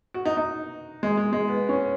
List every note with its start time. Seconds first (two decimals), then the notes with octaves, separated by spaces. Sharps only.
0.14 F#4
0.25 D#4
0.37 D#4
1.03 G#3
1.17 G#3
1.33 G#3
1.48 B3
1.69 C#4